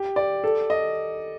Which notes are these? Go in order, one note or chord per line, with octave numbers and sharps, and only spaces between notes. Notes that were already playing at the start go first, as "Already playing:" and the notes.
Already playing: G4
D5
A4
D#5